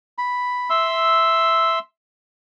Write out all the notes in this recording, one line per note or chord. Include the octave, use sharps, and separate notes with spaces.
B5
E5 C6 E6